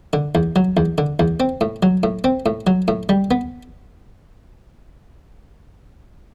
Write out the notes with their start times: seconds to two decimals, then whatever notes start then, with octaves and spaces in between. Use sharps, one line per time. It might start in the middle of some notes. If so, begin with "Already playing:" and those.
0.13 D3
0.35 E2
0.56 F#3
0.77 E2
0.98 D3
1.19 E2
1.40 C4
1.61 A2
1.83 F#3
2.03 A2
2.24 C4
2.46 A2
2.67 F#3
2.88 A2
3.09 G3
3.31 B3